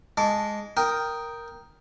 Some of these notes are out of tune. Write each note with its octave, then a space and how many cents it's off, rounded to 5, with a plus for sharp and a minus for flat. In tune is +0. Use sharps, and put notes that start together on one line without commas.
G#3 +0 A5 +0 D6 -30
A#4 +0 G5 +0 D#6 +0